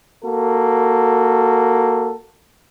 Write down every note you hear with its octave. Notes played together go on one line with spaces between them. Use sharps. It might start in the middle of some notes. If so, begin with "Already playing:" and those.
A#3 F#4 A4